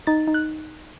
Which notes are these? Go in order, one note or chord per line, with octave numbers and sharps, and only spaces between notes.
D#4 A6
D#4
F#6